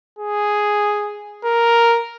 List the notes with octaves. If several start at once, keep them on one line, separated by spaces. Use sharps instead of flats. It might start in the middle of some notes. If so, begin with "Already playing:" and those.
G#4
A#4